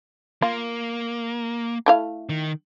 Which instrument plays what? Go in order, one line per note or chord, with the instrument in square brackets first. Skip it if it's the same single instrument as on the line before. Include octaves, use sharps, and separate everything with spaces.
[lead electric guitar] A#3 [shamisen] F4
[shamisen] A3 E4 F5
[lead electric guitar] D#3